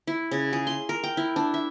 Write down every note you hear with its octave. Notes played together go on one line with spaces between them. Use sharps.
E4
C#3
G#4
C6
A#4
G5
E4
D4
E5